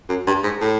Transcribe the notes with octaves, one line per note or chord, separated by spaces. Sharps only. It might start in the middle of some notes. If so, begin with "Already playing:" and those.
F#2
G2
G#2
A2